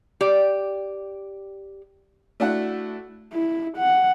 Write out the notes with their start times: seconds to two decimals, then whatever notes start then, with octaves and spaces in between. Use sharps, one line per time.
0.21 G4 D5
2.40 A3 D4 E4 F#4 F#5
3.33 E4
3.77 F#5